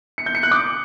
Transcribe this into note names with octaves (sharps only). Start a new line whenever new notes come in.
C#7
G6
C#7
F#6
D6